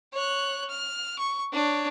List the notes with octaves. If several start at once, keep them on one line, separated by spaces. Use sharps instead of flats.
C#5 F#6
F6
C#6
D4 C#5